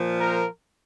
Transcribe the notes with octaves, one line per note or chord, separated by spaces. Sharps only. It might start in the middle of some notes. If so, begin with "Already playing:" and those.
Already playing: A#2 F3
A#4